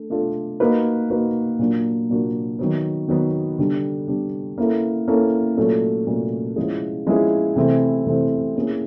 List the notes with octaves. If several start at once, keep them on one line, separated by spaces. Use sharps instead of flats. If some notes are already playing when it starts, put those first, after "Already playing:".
Already playing: A3 D4
A3 D4 F4 A4
A#3 D#4 F#4 B4
A#3 D#4 F#4 B4
A#2 F#3 A#3 D4 F#4
A#2 F#3 A#3 D4 F#4
D#3 F#3 B3
D#3 F#3 B3
D3 G3 B3 D4
D3 G3 B3 D4
A#3 C#4 E4 A4
A#3 C#4 E4 A4
A#2 F#3 A3 C#4
A#2 F#3 A3 C#4
F3 G#3 C#4 E4 G#4
F3 G#3 C#4 E4 G#4
C3 E3 A3 C4 E4
C3 E3 A3 C4 E4
A#3 C#4 E4 G#4